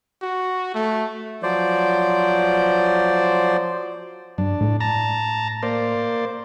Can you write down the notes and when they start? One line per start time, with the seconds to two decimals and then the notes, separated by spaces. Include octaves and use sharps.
0.22 F#4
0.75 A3
1.43 F3 F#3 C5 D5
4.38 G2 D4
4.61 A2
4.80 A5 A#5
5.63 A#3 C5 D5